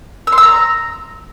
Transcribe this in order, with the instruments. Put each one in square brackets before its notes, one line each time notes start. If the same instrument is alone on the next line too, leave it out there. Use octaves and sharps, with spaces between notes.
[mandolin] E6
C6
E6
A#5